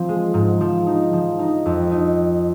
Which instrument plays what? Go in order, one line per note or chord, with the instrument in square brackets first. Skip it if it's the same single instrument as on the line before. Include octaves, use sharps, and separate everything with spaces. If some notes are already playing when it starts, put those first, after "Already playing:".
Already playing: [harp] F3 C4
G#3
G#2
F3
D#4
F3
D#4
F2
D#4